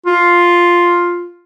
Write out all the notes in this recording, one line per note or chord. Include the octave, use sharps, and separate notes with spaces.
F4